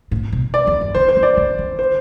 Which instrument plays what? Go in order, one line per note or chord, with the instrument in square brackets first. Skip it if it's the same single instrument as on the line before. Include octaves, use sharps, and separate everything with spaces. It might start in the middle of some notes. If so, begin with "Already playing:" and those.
[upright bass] A2
B2
[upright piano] D5
[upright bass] E2
F#2
[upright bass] D3 [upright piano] C5
[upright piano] C5
[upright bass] E3
[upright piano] D5
[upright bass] D3
D3
[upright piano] C5